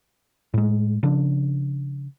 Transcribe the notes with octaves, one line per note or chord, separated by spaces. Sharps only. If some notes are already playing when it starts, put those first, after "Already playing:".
A2 G#3
C#3 F3 D4